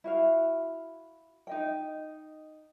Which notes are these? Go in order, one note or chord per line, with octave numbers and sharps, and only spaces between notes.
E4 F#4 F5
D#4 D#5 G5